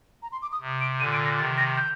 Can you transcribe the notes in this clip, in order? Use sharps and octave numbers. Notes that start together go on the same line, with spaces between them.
A#5
C6
D6
D#6
C3
D7
A#2 D3 D#7
D7
A#6
C3 D#3 A6
A#6
G6